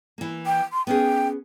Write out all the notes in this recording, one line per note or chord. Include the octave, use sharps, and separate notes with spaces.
E3 A#3
G5
C6
B3 C#4 G#4 G5